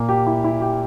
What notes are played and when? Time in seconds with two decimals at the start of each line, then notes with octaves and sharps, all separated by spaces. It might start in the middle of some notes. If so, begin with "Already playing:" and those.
Already playing: A#2 A#3
0.09 G4
0.27 E4
0.44 E4
0.61 G4